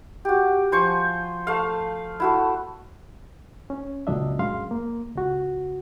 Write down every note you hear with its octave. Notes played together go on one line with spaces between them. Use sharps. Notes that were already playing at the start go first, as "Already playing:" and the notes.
F#4 G4
F3 C5 G#5 C#6
A3 F5
E4 F#4 A4
C#4
C#2 A#2 F#3 D4 D#5 E5
F#2 G#3 F5 C6
A#3
C#2 F#4